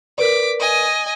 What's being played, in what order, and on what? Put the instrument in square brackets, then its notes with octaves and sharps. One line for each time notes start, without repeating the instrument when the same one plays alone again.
[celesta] A#4 B4 D5 [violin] D6 B6
[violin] D#5 G#5